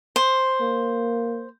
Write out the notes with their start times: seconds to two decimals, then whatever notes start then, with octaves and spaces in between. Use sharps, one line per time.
0.16 C5
0.61 A#3